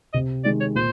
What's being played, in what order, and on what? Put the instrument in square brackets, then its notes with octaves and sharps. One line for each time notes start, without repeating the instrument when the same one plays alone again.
[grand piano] C3 [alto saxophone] D#5
[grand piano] D#3 G#3 [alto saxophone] D5
[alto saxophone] C#5
[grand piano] A#2 [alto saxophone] C5